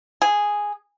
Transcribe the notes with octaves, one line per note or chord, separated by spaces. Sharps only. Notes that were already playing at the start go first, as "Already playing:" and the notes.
G#4